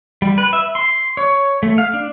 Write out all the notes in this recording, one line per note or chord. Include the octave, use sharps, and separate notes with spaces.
G3
B4
E5
C6
C#5
A3
F5
D4